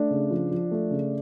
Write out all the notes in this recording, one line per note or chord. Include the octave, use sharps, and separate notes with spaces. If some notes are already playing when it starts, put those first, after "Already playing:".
Already playing: A3 D4
C#3
F3
F3
A3
C#3